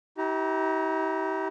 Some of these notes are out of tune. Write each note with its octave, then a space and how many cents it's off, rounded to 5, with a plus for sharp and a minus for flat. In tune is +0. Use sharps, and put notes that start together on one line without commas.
E4 -45 G4 -25 A#5 +0